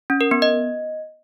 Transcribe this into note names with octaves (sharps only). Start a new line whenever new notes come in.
C#4
A#4
B3
D#5